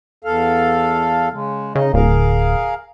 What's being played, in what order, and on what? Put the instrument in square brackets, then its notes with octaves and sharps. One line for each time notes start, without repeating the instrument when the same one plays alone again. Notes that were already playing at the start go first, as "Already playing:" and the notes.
[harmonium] E2 A4 F5
C#3 G#3
[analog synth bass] C#3 [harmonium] D#4 D#5
[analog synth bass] D1 [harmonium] G#4 A#4 F5